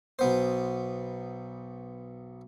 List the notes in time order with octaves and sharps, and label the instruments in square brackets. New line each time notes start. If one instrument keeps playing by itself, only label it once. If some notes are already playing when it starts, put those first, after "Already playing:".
[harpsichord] B1 B3 C5